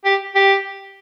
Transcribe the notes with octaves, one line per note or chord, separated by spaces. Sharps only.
G4
G4